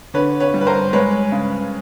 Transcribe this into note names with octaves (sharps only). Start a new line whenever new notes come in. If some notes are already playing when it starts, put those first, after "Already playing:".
D3 B4 C#5
B4 C#5
G3
B4
A#4 C5
G#3 B4 C#5
C#3